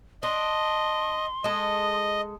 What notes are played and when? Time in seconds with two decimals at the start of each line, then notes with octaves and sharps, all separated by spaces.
0.23 D4 D#5 C6
1.44 G#3 A4 D#5